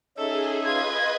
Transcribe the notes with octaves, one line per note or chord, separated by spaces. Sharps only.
C#4 D#4 G#4 A4 E5
F4 B4 D#5 G#6